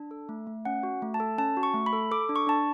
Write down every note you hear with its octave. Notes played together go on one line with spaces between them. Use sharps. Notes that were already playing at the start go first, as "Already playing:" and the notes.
Already playing: D4
A4
A3
A3
C#4 F#5
F#4
A3
A5
A4
C#4 A5
F#4
C#6
A3
B5
A4
A4 D6
D4
C#6
D4 A5